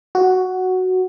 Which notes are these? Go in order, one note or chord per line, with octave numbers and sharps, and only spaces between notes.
F#4